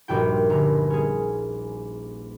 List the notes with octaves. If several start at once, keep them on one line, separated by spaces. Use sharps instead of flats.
D#1 A#1 G2 F#4 G5
G1 A#5
C#4 G#4